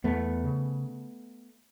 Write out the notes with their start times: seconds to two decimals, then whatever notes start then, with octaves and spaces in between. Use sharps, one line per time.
0.04 E2 A3 B3
0.44 C#3